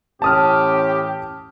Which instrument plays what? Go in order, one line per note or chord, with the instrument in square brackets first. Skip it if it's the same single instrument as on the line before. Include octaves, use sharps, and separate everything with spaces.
[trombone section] A2 E3 C#4 [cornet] G4 [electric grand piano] A5 D#6 F6